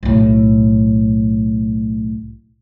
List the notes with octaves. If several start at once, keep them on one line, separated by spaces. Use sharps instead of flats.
B1 A2